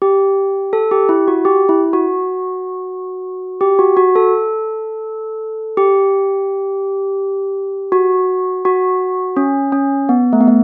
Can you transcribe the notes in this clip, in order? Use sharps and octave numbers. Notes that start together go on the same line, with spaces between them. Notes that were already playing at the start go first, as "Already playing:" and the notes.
G4
A4
G4
E4
F#4
G4
E4
F#4
G4
F#4
F#4
A4
G4
F#4
F#4
C#4
C#4
B3
A3
B3
A3